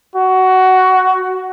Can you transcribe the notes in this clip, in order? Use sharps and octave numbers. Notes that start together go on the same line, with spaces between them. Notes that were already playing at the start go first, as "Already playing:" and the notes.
F#4